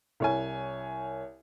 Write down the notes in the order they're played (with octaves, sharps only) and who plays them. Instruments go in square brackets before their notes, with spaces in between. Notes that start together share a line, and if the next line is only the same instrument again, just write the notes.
[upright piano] C2 C#5 G#5